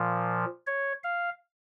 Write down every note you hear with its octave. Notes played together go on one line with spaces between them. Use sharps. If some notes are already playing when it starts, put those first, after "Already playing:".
Already playing: A#2 F3
C#5
F5